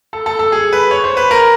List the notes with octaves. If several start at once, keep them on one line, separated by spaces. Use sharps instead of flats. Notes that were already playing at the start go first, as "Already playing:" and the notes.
A4
A4
A4
G#4
B4
C#5
C5
B4
A#4